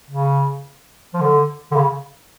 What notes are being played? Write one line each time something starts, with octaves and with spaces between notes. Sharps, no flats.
C#3
F3
D3
D3
C#3